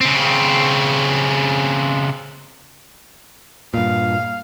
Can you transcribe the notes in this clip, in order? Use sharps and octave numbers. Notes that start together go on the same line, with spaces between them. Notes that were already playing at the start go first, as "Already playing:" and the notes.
C#3 C4
G2 A#2 F5